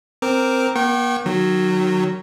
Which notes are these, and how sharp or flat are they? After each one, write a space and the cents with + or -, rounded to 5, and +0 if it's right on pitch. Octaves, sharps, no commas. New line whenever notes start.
C4 -5 A#4 +0 D6 -5
A#3 +45 G5 -30 C#6 -40
D#3 -25 F#3 +0